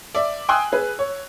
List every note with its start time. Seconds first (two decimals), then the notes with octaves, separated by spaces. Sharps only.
0.15 D5 E5
0.49 G5 G#5 C6 D#6 E6 F#6
0.72 G#4 B4
0.99 C#5